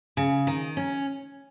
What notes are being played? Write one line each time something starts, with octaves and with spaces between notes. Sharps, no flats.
C#3
D#3
C#4